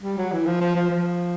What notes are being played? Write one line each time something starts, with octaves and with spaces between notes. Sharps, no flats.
G3
F#3
E3
F3
F3
F3
F3